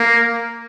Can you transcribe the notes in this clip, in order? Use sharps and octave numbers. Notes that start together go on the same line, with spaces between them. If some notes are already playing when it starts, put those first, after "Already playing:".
Already playing: A#3